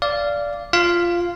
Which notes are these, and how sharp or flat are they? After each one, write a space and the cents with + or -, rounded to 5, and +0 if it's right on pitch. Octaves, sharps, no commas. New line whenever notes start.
D5 -10 F5 -15
F4 -10 F5 -5